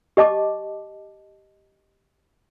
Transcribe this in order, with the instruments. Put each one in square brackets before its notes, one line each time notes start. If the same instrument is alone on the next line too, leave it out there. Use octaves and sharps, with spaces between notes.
[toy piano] G4 D#5 A5 D6